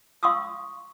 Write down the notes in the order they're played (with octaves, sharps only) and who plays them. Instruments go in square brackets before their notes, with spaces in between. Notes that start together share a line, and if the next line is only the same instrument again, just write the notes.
[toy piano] F5 C6 C#6 D#6 E6